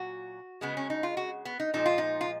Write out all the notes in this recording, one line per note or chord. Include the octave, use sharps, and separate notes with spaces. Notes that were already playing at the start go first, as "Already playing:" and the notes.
Already playing: A#2 F#3 F#4
C#3 G#3 B3
C#4
D#4
F4
F#4
B3
D#4
A#2 F3 G#3 D#4
F4
D#4
F4